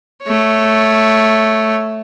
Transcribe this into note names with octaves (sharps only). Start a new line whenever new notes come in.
A3 C#5